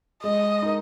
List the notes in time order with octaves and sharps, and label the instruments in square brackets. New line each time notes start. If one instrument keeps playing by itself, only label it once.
[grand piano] G#3 [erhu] D#5
[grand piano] D#4 A#4